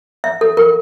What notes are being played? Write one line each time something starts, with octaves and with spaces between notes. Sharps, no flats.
E5
A4
A#4